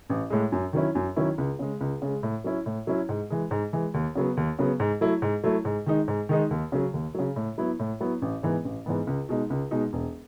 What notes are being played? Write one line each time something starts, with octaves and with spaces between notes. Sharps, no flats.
A1
A2 G#3
F#2
D#3 F#3 C#4 E4
F#2
D#3 F#3 C#4 E4
C#2
C#3 G#3
C#2
C#3 G#3
A2
F#3 C#4 E4
A2
F#3 C#4 E4
G#2
E3 G#3
G#2
E3 G#3
D#2
C#3 F#3 B3
D#2
C#3 F#3 B3
G#2
F#3 A3 E4
G#2
F#3 A3 E4
G#2
D#3 G#3 D#4
G#2
D#3 G#3 D#4
D#2
C#3 F#3
D#2
C#3 F#3
A2
F#3 B3 E4
A2
F#3 B3 E4
A1
G#2 E3 B3
A1
G#2 E3 B3
C#2
B2 G#3 D#4
C#2
B2 G#3 D#4
E1